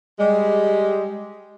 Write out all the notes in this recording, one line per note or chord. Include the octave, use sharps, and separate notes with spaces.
G3 G#3